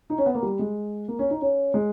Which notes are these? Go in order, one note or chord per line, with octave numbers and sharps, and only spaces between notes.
D#4
C#4
B3
A#3
G3
G#3
A#3
C#4
D#4
C#4
G#3